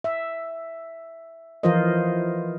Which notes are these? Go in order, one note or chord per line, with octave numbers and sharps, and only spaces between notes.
E5
E3 F3 F4 A#4 C5 D#5